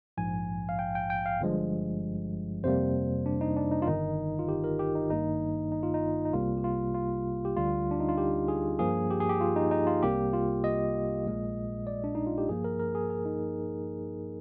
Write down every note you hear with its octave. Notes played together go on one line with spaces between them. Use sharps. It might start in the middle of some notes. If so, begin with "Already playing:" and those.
A#1 G#2 F3 G#5
F5
G5
G5
G5
F5
G1 G2 F3 G#3
F2 C3 G3 A#3 C5
D4
D#4
D4
D#4
F4
G1 G2 D#3 D#4
F4
G4
A#4
G4
D#4
G#1 G2 D#3 A#3 D#4
D#4
F4
D#4
D#4
C2 C3 G3 A#3 F4
G4
F4
F4
G4
D2 D3 G3 F4
D4
D#4
F4
G4
G#4
G2 F3 A#3 G#4
G4
G#4
G4
F4
D#4
D#4
F4
C2 C3 G3 A#3 G4
F4
D#5
A#1 A#2 G#3
D5
D4
D#4
F4
G4
G2 F3 A#3 G#4
A#4
A#4
G#4
G#4
D#4